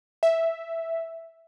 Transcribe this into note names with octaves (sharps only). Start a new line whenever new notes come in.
E5